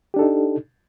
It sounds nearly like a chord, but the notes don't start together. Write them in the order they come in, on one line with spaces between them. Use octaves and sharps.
G4 D4 A4 D#4